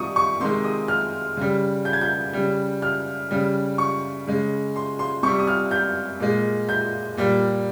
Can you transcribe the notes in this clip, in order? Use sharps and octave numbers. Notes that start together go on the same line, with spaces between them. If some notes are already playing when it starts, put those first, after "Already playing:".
Already playing: C3 D#3 G3 C#6 D#6
C#6
C3 D#3 G#3 C6
D#6
F6
C#3 G3
G6
G#6
G6
C#3 G3
F6
C#3 G3
C#6
C#3 G#3
C6
C6
C3 G3 C#6
D#6
F6
G6
A#2 G#3
G6
A#2 G3